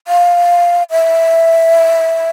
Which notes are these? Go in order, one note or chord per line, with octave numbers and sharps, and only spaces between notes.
F5
E5